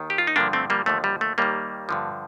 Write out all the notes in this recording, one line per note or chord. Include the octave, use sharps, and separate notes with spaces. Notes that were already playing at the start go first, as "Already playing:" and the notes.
Already playing: D#2 D#3
G4
F4
D#4
G2 D3 F3 A#3 D4
A3 C4
G3 A#3
D#2 D3 F3 A3
G3
A3
D#2 D#3 G3 A#3
G2 D3 F3